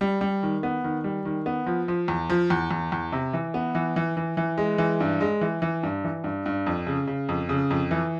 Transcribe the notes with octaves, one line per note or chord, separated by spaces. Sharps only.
G3
G3
D#3
B3
D#3
G3
D#3
B3
F3
F3
E2
F3
E2
E2
E2
C3
E3
B3
E3
E3
E3
E3
G#3
E3
G2
G#3
E3
E3
G2
E3
G2
G2
F2
C#3
C#3
F2
C#3
F2
E3